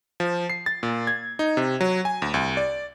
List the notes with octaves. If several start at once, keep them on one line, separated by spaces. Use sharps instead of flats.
F3
C7
A6
A#2
G#6
D#4
C3
F#3
G#5
D2
C2
D5